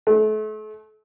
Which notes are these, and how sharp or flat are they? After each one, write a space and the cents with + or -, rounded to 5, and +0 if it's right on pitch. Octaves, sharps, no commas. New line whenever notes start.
A3 -35